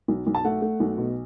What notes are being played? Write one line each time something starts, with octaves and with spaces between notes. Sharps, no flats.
B1
B1
A5
A3 F#5
A3
B1
B2